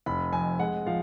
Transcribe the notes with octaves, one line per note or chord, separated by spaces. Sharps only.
F1 B5
F2 G#5
G#3 F#5
F3 F5